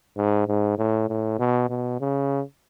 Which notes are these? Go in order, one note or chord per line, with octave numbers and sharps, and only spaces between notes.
G#2
G#2
A2
A2
B2
B2
C#3